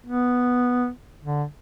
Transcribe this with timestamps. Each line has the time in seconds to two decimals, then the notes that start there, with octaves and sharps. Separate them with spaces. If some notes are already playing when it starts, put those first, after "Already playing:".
0.06 B3
1.23 D3